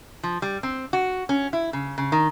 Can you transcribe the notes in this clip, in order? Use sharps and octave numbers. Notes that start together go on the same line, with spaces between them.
F3
G3
C4
F#4
C#4
E4
C#3
C#3
D#3